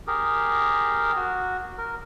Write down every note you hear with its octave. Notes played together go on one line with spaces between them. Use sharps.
G4 G#4 A#4
F#4
A#4